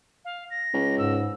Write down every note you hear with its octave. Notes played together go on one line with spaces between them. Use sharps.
F5
A#6
C#2
G#2 E6